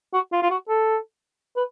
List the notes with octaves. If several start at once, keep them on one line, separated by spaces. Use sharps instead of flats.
F#4
F4
F4
F#4
A4
B4